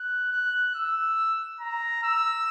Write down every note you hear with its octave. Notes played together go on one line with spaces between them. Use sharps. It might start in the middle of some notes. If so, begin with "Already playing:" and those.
Already playing: F#6
F#6
E6
A#5
E6